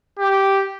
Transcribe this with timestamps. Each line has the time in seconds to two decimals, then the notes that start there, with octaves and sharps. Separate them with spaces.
0.19 G4